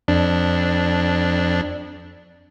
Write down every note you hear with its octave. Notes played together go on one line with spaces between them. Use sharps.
F2 D4